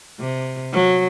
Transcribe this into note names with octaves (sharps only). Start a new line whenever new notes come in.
C3
F#3